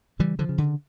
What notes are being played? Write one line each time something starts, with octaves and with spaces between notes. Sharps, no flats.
C#3 E3 G3
D3 F3
C#3
D3